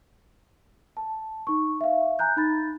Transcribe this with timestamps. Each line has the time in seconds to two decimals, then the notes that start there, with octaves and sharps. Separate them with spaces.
0.97 A5
1.47 D#4 C#6
1.81 E5 F5
2.19 G#5 A#5 F#6 G6
2.37 D#4 B5 A6